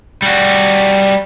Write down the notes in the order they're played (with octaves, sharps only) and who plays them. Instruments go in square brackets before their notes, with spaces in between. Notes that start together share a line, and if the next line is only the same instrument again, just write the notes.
[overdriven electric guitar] G3 F#4